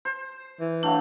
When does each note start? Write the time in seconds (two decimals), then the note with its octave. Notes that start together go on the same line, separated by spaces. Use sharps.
0.05 C5
0.60 E3
0.83 F#3 A3 D4 F5